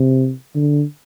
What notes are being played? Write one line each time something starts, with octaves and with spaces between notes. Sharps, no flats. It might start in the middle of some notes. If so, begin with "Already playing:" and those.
Already playing: C3
D3